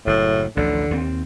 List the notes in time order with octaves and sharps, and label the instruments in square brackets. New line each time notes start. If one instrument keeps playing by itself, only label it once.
[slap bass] F#1 [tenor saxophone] A2
[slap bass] A1 D2 F3 [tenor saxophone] D3
[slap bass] D#2 G#3 C4